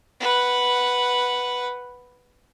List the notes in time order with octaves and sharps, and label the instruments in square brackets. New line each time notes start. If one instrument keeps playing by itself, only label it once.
[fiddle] B4 F#5